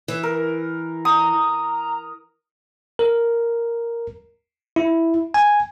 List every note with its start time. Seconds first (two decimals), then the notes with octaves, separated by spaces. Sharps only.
0.08 E3
0.23 A#4
1.05 A#5 D#6
2.99 A#4
4.76 E4
5.34 G#5